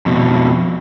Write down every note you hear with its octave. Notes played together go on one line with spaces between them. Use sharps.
F2 B2